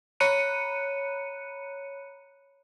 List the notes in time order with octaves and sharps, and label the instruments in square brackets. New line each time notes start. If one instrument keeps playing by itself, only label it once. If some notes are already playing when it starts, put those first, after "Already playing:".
[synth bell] C#5 A#5 B5 F#6 C#7 D#7